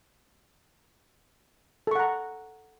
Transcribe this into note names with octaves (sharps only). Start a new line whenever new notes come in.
A4 F#5 A#5 C#6